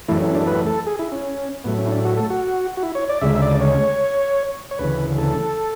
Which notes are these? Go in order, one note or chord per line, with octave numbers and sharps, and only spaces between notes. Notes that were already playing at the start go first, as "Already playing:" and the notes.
F#2 E3 A3 E4
C#4
D4
B4
A4
G#4
E4
C#4
A2 F#3 A3 B3
C#4
E4
D4
F#4
A4
F#4
F#4
E4
C#5
D5
D2 C#3 G#3 E5
E5
D5
C#5
C#5
D2 C#3 E3 B4
A4